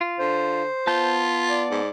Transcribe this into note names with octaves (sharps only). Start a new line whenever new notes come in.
F4
D3 C5
B3 F4 A5 G6
D5
G#2